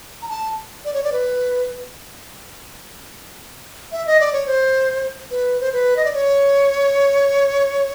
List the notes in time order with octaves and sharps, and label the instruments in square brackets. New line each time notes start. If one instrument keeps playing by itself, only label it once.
[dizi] A#5
A5
D5
C#5
D5
B4
E5
D#5
D5
C#5
C5
B4
C5
B4
D#5
D5
C#5